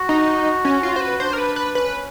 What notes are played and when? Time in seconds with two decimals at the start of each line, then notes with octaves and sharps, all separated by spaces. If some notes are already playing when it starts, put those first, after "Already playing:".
Already playing: F#4
0.09 D#4
0.65 C#4
0.83 F4
0.96 C5
1.01 B4
1.20 D4 C5
1.33 A#4
1.39 B4
1.56 B4
1.75 C#4 B4